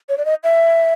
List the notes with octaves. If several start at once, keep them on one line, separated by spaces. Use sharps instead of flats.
C#5
D5
D#5
E5